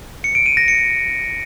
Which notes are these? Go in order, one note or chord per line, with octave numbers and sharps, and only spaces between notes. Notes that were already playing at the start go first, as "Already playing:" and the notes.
C#7
D7
D#7
A#6
C#7